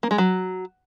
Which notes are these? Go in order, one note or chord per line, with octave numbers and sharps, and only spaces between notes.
A#3
G#3
F#3